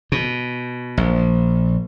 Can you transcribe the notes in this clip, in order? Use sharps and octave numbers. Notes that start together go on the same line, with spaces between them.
B2
A#1